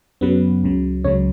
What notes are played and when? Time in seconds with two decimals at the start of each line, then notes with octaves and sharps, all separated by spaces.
0.21 F#2 C#3 F#3 B3 B4
0.64 C#2 C#3 F#3
1.04 C#2 C#3 F#3 C#4 C#5